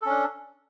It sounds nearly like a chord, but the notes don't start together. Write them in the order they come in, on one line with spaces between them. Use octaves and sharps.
A4 C#4 D4